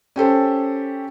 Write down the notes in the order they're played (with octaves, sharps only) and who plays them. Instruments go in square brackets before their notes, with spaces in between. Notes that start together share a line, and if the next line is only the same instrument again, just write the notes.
[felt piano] C#4 G4 A4 C5